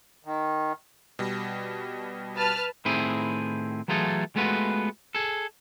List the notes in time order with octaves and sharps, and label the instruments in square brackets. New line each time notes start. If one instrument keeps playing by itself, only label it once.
[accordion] D#3
[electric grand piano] B2 G3
[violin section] B4 A5 F6
[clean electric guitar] A2 D#3 C4 E4 G#4
E3 F#3 A3 F4 G#4 A4
G#3 A3 B3 F4 F#4 B4
G#4 A4